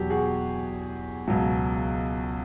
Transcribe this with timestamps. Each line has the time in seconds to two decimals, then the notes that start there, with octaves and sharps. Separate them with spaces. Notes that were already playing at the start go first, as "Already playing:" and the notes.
Already playing: E2 B2 F#3 G4
0.10 F#4 G#4
1.28 C#2 B2 F#3